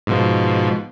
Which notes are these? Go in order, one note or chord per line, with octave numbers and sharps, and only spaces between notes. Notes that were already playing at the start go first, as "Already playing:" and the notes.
G#2 B2 F3